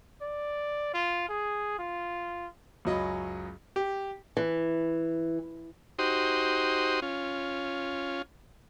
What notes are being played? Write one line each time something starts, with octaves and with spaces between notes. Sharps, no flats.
D5
F4
G#4
F4
C#2 F#2 F#3 D#5 B5
G4
E3
D#4 F#4 G4 C5 C6 D#6
C#4 F4